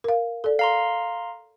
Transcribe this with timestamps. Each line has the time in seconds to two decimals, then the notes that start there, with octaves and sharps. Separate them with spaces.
0.04 A#4 F5
0.44 A4 D5
0.59 F5 A#5 C6